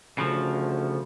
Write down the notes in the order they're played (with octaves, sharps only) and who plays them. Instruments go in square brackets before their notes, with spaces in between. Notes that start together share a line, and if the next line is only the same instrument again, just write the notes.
[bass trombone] D2 [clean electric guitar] C#3 F3